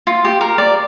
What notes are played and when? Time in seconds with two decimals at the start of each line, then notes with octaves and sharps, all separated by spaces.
0.07 F4
0.25 G4
0.41 A#4
0.58 D5